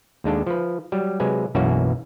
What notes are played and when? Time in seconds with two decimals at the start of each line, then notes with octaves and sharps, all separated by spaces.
0.24 D#2 G#3 D4 A4
0.47 F3 B4
0.92 F#3 G3
1.20 C3 F#3 G#3 B4 G#5
1.55 B1 F#2 E3 A#3 C#4 F#4